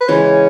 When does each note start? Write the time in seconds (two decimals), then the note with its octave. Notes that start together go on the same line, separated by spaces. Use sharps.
0.01 B4
0.08 C#3 E3 G#3 C#5